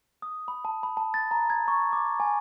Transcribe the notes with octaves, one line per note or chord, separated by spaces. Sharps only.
D#6
B5
A5
B5
A5
A6
A#5
G#6
C#6
D6
G#5